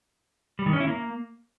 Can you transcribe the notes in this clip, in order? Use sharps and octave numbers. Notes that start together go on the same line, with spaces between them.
G3
D#3
C#4
E4
A#3